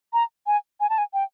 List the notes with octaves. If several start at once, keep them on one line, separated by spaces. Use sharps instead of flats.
A#5
G#5
G#5
A5
G#5
G5